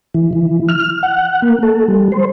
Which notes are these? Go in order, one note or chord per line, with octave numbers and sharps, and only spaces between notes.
E3
E3
F6
F#5
A#3
A4
G3
C5